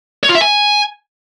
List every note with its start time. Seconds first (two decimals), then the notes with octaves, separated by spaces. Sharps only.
0.23 C#5
0.29 F4
0.35 E5
0.41 G#5